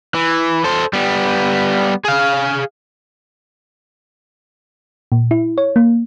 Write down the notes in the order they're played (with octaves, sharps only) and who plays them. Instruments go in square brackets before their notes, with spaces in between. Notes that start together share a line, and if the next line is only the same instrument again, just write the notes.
[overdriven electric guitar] E3
A4 C5
G3 B3
G#4 F5
[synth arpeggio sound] A#2
E4
C#5
A#3